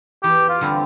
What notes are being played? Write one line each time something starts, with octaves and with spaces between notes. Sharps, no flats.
E2 G4
F4
D3 G3 C4